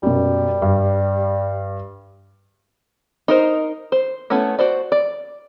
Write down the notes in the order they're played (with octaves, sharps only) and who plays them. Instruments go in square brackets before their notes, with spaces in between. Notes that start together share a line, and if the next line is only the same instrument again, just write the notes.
[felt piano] F#2 B2 [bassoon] G3
[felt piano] G2
[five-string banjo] D#4 A#4 C5
C5
A3 B3 C#4 E4
F#4 C5 D5
D5